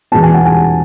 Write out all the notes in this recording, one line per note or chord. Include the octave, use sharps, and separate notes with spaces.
E2 B2 G#3 B3 A5
G#5
F#5
G#5